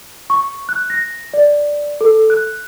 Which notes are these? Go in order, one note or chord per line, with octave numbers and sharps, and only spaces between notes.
C#6
F#6
A#6
D5
A4
F#6